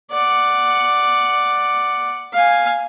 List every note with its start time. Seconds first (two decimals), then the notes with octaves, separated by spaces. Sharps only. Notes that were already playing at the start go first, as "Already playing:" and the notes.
0.11 D5 F#5
2.33 F5 G#5